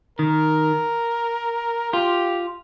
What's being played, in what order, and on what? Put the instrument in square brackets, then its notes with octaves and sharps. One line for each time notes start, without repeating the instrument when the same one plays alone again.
[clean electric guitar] D#3 [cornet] A#4
[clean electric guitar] F4 [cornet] G4